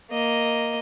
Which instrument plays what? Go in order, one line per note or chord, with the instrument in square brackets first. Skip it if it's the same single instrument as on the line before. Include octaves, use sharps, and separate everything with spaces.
[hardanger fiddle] A#3 D#5